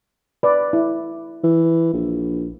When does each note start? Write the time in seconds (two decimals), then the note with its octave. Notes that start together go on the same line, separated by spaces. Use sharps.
0.43 B4 D5
0.73 E4
1.44 E3
1.93 A#1